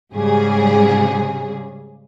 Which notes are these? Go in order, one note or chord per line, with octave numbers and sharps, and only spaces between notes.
G#2 C#3 G3 G#4